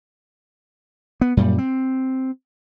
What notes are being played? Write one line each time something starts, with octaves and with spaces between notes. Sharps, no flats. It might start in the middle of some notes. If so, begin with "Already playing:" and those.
B3
F#2 A#2 G3
C4